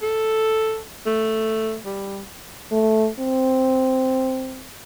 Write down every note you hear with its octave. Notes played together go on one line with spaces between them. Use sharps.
A4
A3
G3
A3
C4